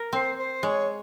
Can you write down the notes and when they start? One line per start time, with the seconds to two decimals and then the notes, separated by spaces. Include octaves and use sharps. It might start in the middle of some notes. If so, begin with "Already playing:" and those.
Already playing: A#4
0.13 C4 C5
0.38 C5
0.63 G#3 C#5